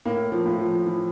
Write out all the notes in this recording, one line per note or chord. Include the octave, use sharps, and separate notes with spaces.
A2 A#3
F3
A2
F3
E3